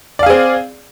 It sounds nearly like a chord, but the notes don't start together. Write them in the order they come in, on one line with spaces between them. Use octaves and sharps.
D5 F5 G#4 C4